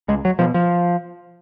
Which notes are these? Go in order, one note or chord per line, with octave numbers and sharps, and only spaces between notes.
C#2 G#3
F#3
B2 F3
F3